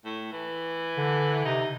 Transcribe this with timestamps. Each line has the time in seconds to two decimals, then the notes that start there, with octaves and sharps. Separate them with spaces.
0.05 A2
0.33 E3
0.97 D3
1.45 C3 D#4